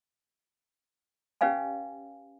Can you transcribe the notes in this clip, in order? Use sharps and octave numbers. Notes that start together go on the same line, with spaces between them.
C#4 G4 B4 D5 F5 G#5